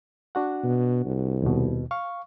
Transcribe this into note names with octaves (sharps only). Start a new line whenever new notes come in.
D4 F#4 F#5
B2
C2
D#2 B2
F5 C#6